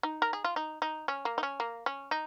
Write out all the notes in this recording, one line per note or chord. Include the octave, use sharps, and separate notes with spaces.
D#4
A#4
G#4
F4
D#4
D#4
C#4
A#3
D#4
C#4
A#3
C#4
D#4